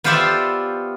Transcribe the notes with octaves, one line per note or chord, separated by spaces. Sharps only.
B3 F4 G4 C5 D5 E5